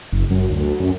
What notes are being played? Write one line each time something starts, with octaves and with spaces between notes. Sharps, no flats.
F#1
F#2
D2
F#2